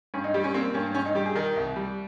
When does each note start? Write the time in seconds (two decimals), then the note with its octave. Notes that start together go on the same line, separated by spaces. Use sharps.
0.14 G2 C#4
0.24 D#4
0.34 G3 G4
0.44 C#4
0.54 A#3 C4
0.74 G2 C#4
0.94 G2 C#4
1.05 D#4
1.15 G3 G4
1.26 G#4
1.35 D#3 A#4
1.57 C2
1.76 G3